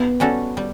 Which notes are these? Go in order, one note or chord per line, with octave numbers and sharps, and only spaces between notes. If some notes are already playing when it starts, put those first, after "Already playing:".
Already playing: B3
G3 C#4 F#4 A4
G3